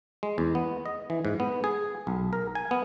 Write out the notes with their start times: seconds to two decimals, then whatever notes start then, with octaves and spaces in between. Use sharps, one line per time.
0.23 G#3
0.38 E2
0.55 B3
0.86 D#5
1.10 E3
1.25 G#2
1.40 B3
1.64 G#4
2.07 B1
2.33 A#4
2.55 G#5
2.71 B3